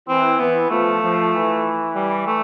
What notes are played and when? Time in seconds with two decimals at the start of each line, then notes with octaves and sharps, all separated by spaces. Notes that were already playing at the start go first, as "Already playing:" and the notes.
0.08 E3 C4
0.39 E3 B3
0.70 F3 A3
1.02 F3
1.33 E3
1.95 G3
2.26 A3